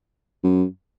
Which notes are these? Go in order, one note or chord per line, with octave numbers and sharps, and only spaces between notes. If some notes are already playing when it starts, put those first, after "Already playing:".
F#2